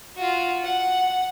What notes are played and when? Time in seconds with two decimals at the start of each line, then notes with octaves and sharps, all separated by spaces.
0.16 F4 F#4
0.64 F#5